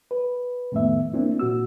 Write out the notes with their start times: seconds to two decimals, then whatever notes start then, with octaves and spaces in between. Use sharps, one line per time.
0.11 B4
0.72 F2 A2 D#3 A3 B3 E5
1.14 A#3 C4 D4 E4
1.39 A#2 F#4 E6